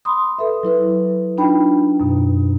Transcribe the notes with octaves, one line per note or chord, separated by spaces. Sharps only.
B5 C6 D#6
A4 B4 E5
F#3 E4 B4 E5
D4 D#4 F4 G5 B5
F#2 B2